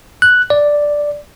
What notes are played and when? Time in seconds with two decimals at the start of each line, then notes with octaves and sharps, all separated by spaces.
0.22 F#6
0.50 D5